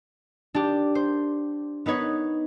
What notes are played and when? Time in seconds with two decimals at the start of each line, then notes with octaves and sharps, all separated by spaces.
0.54 D4 G4
0.95 C5
1.86 B3 D#4 B4 C#5